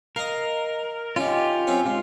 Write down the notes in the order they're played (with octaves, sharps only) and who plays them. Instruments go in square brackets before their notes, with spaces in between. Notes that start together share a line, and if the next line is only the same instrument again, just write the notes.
[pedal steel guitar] A#4 [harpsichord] D#5 F5
[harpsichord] D#3 C#4 [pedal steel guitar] F4 G4
[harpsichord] F#2 C4 C#4
[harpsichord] G#2 [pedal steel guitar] F4